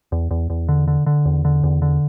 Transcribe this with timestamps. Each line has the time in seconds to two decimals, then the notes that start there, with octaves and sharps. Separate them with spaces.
0.12 E2
0.31 E2
0.50 E2
0.69 D3
0.88 D3
1.06 D3
1.25 E2
1.45 D3
1.64 E2
1.82 D3